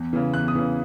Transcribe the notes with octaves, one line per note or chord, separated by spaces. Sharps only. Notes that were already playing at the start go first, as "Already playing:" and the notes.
Already playing: E2
C#3 E3
E2 F#6
D#6
C#3 E3